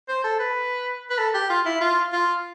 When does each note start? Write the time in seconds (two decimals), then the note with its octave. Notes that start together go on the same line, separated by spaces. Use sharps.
0.08 C5
0.24 A4
0.39 B4
1.10 B4
1.18 A4
1.34 G4
1.49 F4
1.65 E4
1.81 F4
2.12 F4